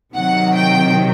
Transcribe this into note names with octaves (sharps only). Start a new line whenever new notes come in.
C3 D#3 F#3 F#5
G5